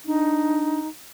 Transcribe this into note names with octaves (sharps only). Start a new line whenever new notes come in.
D4 D#4